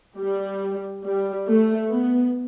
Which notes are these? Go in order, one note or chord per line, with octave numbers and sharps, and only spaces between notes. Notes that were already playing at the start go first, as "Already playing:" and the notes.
G3
G3
A3
B3